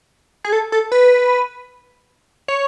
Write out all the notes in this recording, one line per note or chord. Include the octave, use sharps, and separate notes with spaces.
G#4
A4
A4
B4
C#5